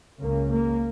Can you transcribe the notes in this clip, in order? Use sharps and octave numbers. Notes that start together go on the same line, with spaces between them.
C#2 C#3 A#3
A#3